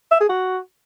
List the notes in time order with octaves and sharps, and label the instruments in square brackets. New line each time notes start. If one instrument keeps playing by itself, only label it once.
[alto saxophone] E5
G#4
F#4